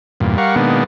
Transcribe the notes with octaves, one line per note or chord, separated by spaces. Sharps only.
E2 G2 A#2
G3 A#4 F5 F#5 C#6
B2 D#3 G#3 A#3 B3 D4